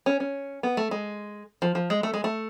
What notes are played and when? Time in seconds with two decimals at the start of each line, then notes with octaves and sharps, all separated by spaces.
0.06 C#4
0.20 C#4
0.63 B3
0.77 A3
0.91 G#3
1.62 F3
1.75 F3
1.90 G#3
2.03 A3
2.14 G#3
2.24 A3